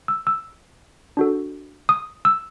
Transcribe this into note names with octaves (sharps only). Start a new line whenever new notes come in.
E6
E6
D4 F#4 A4
D#6
E6